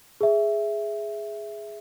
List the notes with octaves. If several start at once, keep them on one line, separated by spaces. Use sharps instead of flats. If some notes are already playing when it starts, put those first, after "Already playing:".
G#4 E5